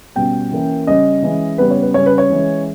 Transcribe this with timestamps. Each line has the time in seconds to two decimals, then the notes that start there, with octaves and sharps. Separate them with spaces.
0.15 B2 G3 C#4 G5
0.52 E3 A#3 C#4
0.87 C#3 G3 C#4 D#5
1.22 E3 G#3 C#4
1.58 C#3 G3 B3 B4
1.70 C#5
1.82 B4
1.94 C#3 G3 C#4 C#5
2.06 B4
2.18 C#5
2.30 E3 G#3 C#4